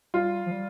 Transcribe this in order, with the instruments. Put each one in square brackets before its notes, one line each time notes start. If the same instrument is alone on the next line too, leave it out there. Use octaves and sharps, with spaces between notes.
[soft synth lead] G3 [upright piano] F4
[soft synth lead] F3
G3